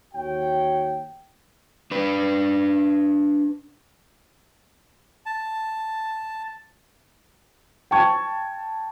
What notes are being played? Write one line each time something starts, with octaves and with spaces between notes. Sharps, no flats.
D#2 F#4 C#5 G5
D4 B4
A5
G5 A5 C#6 G#6